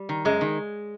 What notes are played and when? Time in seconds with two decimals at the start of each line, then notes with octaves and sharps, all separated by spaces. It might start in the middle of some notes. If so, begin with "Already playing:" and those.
Already playing: G3
0.09 D#3
0.25 F#2 G#3
0.41 D#3